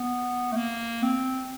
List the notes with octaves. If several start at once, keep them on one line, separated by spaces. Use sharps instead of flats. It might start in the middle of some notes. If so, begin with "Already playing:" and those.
Already playing: B3
A3
A#3
C4